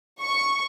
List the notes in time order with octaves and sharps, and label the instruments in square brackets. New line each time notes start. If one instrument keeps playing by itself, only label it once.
[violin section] C#6